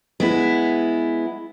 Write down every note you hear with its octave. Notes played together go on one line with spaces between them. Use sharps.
G#3 B3 E4